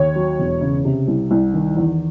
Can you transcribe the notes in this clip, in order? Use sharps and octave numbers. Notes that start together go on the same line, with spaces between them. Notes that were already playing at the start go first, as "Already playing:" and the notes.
Already playing: D#2 C#5
F#3
E1
C#3
C3
C2
C2
D#3
E2